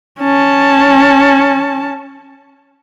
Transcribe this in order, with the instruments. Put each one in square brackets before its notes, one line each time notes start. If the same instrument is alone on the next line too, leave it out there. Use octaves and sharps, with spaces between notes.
[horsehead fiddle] C#4 A5